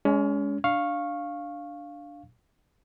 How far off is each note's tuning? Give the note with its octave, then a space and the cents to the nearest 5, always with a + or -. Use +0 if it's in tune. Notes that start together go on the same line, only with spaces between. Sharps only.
G#3 -5 C#4 +35
D4 +0 F5 +0 C#6 -15